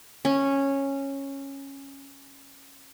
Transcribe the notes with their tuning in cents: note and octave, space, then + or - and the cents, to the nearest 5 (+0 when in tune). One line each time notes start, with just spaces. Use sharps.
C#4 -10